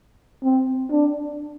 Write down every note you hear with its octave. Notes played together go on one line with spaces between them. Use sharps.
C4
D4